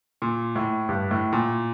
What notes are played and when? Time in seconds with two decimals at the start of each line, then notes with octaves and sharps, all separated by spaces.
0.22 A#2
0.55 A2
0.89 G2
1.11 A2
1.33 A#2